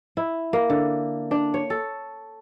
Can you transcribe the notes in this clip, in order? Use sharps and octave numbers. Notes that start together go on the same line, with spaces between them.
E4
A#3
D3
D4
C#5
A4